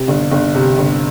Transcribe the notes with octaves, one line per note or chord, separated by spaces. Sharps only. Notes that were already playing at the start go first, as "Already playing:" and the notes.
Already playing: C3
G1
G1
C3
G1